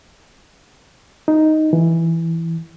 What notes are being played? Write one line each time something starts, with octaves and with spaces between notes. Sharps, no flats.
D#4
E3